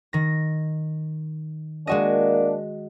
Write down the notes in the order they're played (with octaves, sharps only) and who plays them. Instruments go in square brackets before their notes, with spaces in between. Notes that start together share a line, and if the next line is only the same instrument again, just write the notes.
[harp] D#3 A#6
[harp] G#3 F#4 D#5 [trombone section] A#3 D4